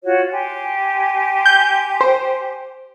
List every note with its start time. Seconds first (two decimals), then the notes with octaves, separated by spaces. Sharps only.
0.03 F4 F#4 C#5
0.32 G4 G#5 C6
1.46 G6
2.01 C5